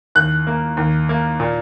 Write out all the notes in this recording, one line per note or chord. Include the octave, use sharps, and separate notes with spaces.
D#2 F#6
A#3
D#2
A#3
A#2